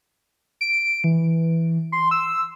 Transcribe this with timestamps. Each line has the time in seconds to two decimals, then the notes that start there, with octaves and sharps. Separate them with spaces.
0.61 D7
1.04 E3
1.92 C6
2.11 E6